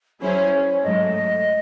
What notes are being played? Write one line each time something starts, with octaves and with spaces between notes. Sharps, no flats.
F#3 C#4 E4 G#4 C5 C#5
G#2 F#3 A3 D#5